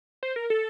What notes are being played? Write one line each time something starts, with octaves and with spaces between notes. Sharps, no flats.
C5
A#4
A4